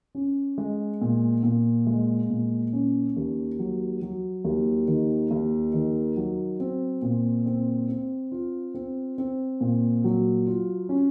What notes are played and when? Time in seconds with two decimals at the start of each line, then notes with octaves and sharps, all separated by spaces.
0.15 C#4
0.58 G#3
1.01 A#2
1.43 A#2
1.87 G#3
2.30 A#2
2.73 C#4
3.16 D#2
3.59 F#3
4.02 F#3
4.45 D#2
4.88 D#3
5.31 D#2
5.74 D#3
6.17 F#3
6.60 C4
7.02 A#2
7.46 C4
7.89 C4
8.32 F4
8.75 C4
9.18 C4
9.61 A#2
10.04 F#3
10.47 F4
10.89 C#4